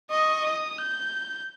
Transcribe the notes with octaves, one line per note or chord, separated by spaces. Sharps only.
D#5 C#6
D#6
G6